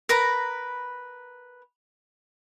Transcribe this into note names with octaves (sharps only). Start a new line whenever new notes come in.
A#4 B4 A#5 B5